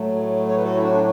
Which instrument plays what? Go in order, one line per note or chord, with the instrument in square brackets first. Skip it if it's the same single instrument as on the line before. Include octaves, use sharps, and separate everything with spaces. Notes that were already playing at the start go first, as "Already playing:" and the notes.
Already playing: [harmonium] A2 F#3 A3
C#5
B4
F#4 A4
E4
D4 F#4
D4